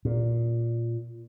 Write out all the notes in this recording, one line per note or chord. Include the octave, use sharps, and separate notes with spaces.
A#2